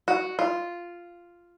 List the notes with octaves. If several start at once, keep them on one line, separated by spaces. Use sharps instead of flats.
F#4
F4